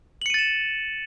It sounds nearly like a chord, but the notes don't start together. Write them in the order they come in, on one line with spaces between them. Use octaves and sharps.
F#7 C#7 D#7 A6 E7